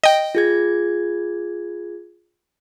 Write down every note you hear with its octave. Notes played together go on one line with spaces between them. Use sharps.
D#5 G5
F4 G#4 G#6